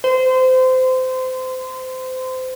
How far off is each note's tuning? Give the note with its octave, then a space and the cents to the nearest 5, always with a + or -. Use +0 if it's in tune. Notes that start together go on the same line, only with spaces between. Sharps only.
C5 -25